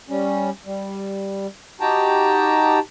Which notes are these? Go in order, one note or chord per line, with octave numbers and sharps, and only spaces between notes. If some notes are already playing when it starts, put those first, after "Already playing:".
G3 C#4
G3
D#4 F#4 G4 G5 A5 A#5